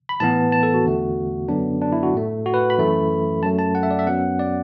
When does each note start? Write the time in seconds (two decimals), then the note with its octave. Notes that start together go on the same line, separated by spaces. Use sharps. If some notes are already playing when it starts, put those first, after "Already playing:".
0.09 B5
0.20 A2 E3 B3 A5
0.52 A5
0.63 A4
0.74 F#4
0.84 E2 D3 A3
1.49 F#2 D3 F#3 B3 D4
1.81 D4
1.92 E4
2.03 F#4
2.14 A2 A3
2.46 F#4
2.54 B4
2.70 B5
2.78 F#2 E3 A3
3.43 F#2 F#3 A3 A5
3.59 A5
3.75 F#5
3.83 E5
3.91 D5
3.99 E5
4.07 F#2 F#3 B3 F#5
4.39 D5